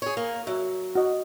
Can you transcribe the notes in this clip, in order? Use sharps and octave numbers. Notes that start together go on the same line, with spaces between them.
G#4 C#5
A#3
F#3 E5
F#4 D#5